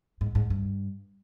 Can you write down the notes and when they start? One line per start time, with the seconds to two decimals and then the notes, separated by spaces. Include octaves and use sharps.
0.21 G#2
0.35 G#2
0.50 G2